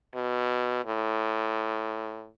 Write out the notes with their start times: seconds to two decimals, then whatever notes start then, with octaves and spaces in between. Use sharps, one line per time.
0.15 B2
0.85 A2